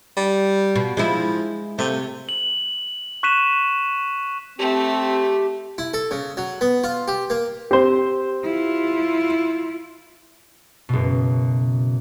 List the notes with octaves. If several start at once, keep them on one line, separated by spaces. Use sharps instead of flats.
G3
B2
F3 G#3 E4
C3 A3
F#7
C#6 F#6 B6 D#7 E7
A3 C4 G4
E4
A4
C#3
F#3
B3
F4
G4
A#3
C4 G4 C5
E4 F4
F#1 B2